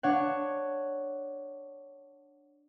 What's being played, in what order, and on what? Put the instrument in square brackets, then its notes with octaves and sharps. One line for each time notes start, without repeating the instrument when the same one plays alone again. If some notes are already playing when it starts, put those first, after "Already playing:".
[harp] D4 C#5 F#5